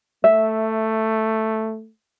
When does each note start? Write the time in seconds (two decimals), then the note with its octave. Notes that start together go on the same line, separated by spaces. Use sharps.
0.24 A3 E5